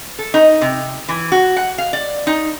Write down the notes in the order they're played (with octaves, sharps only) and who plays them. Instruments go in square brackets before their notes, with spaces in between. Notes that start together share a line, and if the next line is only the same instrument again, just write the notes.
[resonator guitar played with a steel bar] A4
D#4
C3
E3
F#4
F#5
F5
D5
D#4